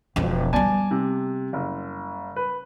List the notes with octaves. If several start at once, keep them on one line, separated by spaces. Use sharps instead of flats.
E1 F2
G3 B3 D5 G#5 A5
C3
F#1
B4